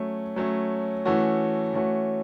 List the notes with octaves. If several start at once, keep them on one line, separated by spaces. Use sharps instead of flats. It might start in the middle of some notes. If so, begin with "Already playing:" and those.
Already playing: F#3 A3 C#4
F#3 A3 C#4
E3 A3 C#4 F#4
E3 A3 C#4 F#4